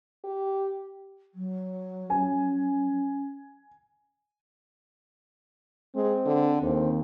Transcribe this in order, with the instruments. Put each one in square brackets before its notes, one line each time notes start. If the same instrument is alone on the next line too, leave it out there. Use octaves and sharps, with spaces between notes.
[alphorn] G4
[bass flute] F#3
[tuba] C#4 [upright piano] G#5
[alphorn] G#3 [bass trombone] C4
[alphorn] D3
[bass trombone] D#2 [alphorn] C4